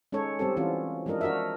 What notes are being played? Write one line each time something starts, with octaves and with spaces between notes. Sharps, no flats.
G#3 C#4 D#4 A4 C#5
G3 C4 G4 A4
E3 C4 C#4 F4 F#4
F3 G#3 D4 A#4 D#5
D4 F#4 A#4 D#5 E5